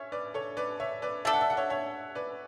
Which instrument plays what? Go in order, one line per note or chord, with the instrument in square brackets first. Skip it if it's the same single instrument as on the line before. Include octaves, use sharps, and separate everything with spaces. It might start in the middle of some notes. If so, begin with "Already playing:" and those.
Already playing: [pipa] C#4 [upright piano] C#5 E5
[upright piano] B4 D5
A4 C#5
B4 D5
C#5 E5
B4 D5
[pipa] A3 D4 A4 [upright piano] E5
[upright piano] F#5
E5
F#5
C#5 E5
C#5 E5
B4 D5